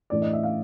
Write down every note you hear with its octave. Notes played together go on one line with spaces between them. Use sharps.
A2 E3 A3 D4 D5
D#5
E5
F5